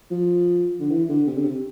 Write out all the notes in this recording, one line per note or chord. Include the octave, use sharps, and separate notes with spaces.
F3
D3
E3
D3
C3
D3
C3